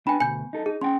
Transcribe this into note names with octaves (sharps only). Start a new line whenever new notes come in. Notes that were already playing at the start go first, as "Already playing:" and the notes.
B3 D4 G5 G#5 B5
D2 B2 G#5 G6
D#4 A4
D#4 G#4
C#4 F#5 G5 C6